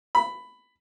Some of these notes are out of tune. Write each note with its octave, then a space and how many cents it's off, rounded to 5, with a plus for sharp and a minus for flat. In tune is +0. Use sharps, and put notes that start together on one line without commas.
B5 +10